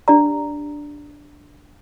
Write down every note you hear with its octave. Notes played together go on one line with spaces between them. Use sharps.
D4 G4 D5 A#5